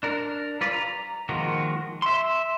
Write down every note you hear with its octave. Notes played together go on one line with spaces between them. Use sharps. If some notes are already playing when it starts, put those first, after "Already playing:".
D4 A#4
G3 F4 B4 D5
A#5
D#3 F3 G#3 A#3 F#4
E5 C6